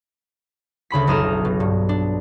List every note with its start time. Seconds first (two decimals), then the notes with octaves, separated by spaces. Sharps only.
0.90 D2 C#3 B5 B6
1.07 F#1 B1 A#5 D#6 F6 E7
1.45 B2
1.60 G2
1.89 D4